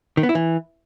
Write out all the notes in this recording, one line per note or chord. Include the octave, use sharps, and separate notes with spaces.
D#3
B3
E4
E3